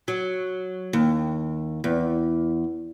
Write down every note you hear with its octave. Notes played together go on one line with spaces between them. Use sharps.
F#3
D#2
E2